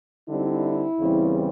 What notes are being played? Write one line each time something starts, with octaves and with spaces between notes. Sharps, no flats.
D3 G3 C4 D#4 E4
E2 C#3 E3 G3 C4